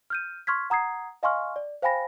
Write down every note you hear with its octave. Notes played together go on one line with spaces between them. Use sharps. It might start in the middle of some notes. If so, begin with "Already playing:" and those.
F6 G6 D#7
C6 C#6 F6 G#6 B6
F#5 A#5 D#6 G#6 C7
D#5 F5 G#5 C6 C#6 F6
D5
C5 F5 G5 G#5 B5 A#6